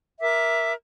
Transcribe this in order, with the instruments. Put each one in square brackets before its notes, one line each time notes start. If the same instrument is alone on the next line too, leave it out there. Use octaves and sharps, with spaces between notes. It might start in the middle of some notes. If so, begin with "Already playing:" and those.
[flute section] A#4 E5 D6